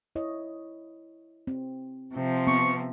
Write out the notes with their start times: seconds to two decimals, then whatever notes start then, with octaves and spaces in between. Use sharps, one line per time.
0.15 E4 C#5 D#5
1.47 C4
2.13 C3 F3
2.47 B3 C4 C#6